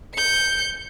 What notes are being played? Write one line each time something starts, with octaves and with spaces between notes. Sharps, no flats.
G6 C#7